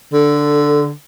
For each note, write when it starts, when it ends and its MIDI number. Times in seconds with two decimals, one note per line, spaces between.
0.13 0.92 50
0.13 0.86 69